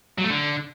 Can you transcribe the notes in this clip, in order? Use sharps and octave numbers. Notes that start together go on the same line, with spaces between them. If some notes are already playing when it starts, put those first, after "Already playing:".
F#3
A3
D3